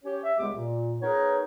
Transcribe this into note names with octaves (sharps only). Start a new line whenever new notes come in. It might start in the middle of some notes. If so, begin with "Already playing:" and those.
C#4 G4 C#5
E5
C#2 G3 G#3 B3 G4 D6
A#2
B3 D#4 G#4 A#4 B4 C#5